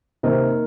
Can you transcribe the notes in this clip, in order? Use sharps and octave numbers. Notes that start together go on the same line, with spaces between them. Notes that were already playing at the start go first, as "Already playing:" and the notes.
C3 A#3 C4 D#4 A#4 D#5